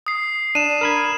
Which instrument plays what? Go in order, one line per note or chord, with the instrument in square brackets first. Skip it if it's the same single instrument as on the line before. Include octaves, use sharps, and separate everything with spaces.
[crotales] D#6 C7
[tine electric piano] D4 [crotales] D#7 E7
[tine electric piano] A#4 B5 G#6